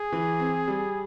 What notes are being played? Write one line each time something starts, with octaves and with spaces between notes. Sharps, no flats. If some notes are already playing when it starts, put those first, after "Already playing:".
Already playing: G#4
E3
C4
G3